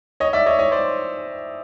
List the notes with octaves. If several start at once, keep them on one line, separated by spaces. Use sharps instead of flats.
C#5 D#5
D5 E5
C#5 D#5
C#5 D#5
C5 D5